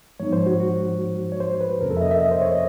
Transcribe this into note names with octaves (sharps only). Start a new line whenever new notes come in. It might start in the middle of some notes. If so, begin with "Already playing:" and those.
G#2 F3 G#3 B3 D#4 C#5
C5
F#4
F#4
C#5
C5
B4
F2 C3 F3 A#3 C#4 A#4
A4
E5
D#5
E5
D#5
C5
C#5
D#5